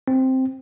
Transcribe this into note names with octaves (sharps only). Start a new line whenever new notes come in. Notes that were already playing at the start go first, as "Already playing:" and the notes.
C4